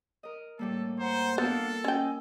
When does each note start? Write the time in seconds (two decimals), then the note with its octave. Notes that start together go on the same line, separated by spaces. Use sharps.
0.23 A#4 D#5
0.59 A2 G3 A#3 A4
1.00 C5 F#5 A#5
1.38 B3 D4 F4 A4 A#4 F5 F#5
1.84 C#4 D#5 G5 G#5 E6